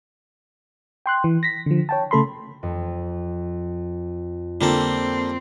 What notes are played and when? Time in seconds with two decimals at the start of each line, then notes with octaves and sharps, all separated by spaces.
1.06 G5 C6 F#6
1.24 E3
1.43 A#6 B6
1.66 D3 F3
1.89 C#5 G5 A5
2.11 C#3 A3 A4 B5 C6
2.63 F2
4.61 D3 G3 A#3 C4 F4 A4